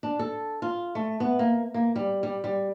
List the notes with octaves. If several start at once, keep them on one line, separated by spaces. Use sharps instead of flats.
D4
A4
F4
A3
B3
A#3
A#3
G3
G3
G3